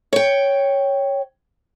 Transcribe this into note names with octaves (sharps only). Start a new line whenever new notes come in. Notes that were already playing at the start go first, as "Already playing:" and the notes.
C#5 G5